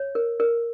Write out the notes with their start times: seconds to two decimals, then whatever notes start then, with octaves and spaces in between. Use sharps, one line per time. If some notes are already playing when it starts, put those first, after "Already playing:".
Already playing: C#5
0.15 A#4
0.40 A#4